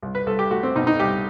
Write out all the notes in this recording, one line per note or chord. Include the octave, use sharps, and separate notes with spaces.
C2
B4
C2 A4
G4
A3 F#4
C4
B2 D#4
D#4
C2 G4